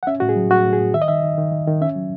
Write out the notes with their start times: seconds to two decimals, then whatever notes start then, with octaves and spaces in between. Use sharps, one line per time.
0.03 F#5
0.07 C#4 E5
0.20 A2 F#4
0.29 G#4
0.36 F#3
0.51 A2 F#4
0.65 A2
0.73 G#4
0.80 A2
0.94 D#3 E5
1.02 D#5
1.08 D#3 E5
1.24 D#3
1.38 D#3
1.52 D#3
1.67 D#3
1.81 C#4 E5
1.96 F#3